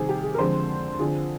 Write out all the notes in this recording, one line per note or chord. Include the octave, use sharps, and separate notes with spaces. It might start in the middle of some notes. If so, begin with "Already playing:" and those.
Already playing: C3 D#3 G3 C4 G#4
G4
G#4
A#4
F2 D3 G#3 C4 C5
D3 F3 C4 G#4